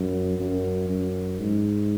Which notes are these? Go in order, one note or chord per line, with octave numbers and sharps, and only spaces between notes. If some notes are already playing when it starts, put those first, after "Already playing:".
Already playing: F#2
F#2
F#2
G#2